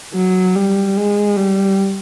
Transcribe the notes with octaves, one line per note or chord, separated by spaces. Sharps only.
F#3
G3
G#3
G3